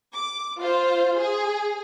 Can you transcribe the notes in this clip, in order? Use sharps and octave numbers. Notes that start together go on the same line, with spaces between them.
D6
F4 C5
G#4